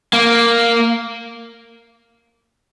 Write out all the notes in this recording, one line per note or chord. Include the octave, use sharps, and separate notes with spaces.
A#3